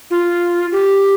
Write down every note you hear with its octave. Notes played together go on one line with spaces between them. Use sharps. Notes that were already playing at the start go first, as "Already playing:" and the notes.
F4
G4